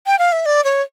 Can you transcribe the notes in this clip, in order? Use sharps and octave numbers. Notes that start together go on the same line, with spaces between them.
G5
F5
E5
D5
C#5